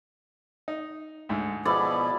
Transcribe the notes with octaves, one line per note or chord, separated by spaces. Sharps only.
D#4
D2 G#2
B2 F3 B3 E4 G#4 D5